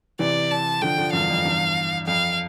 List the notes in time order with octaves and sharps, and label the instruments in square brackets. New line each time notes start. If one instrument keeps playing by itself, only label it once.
[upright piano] C3 E3 [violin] D5
[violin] A5
[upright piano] D3 F3 [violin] G5
[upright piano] D3 F3
[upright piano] E2 G2 [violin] F5
[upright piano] F2
E2 G2
[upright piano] F2 [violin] F5